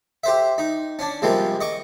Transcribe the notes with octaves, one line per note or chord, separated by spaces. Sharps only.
G4 C5 E5
D#4
C#4 D4
C3 F3 G3 G#3 A#3
D#5 C#6 D6